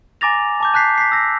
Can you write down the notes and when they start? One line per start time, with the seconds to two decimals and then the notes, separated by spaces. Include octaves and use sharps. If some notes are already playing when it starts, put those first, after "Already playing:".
0.21 G#5 A#5 D6 A6 A#6 F7
0.60 A5 D6 G6
0.74 A5 F#6 G6 B6 C7
0.98 B6 C7
1.12 E6 A#6